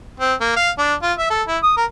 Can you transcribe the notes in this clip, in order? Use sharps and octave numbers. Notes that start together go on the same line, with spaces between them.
C4
A#3
F5
D4
F4
E5
A4
E4
D#6
A#4